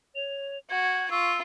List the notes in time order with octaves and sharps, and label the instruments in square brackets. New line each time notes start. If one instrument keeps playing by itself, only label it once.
[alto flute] C#5 [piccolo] F7
[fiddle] F#4 [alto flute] F#5 [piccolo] G#6
[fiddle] F4 [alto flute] C#6 [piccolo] E6